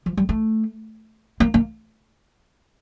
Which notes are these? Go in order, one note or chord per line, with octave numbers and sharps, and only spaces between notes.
F3
G3
A3
A#3
A#3